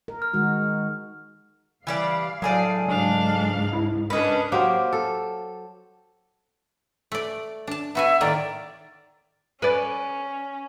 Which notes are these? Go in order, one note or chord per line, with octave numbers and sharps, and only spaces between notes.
A#4
F6
D#3 G#3 F#4
E3 G3 D5 F5
A2 F#3 G#4 D5
C#2 G#2 F#3 D4 F5
E4
C#4 D4 A#4 B4 D#5
F#3 A#3 G4 C5
A4
A3 D5
D4 A5
B3 F#4 E5 G#5
A2 D#3 A#3 D5
C#4 B4 D5